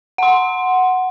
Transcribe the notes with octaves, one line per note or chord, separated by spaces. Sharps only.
F#5 C6